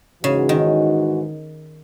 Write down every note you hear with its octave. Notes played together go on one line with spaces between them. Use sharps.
G#2 C#3 E3 G#3 D#4 F#4
D#3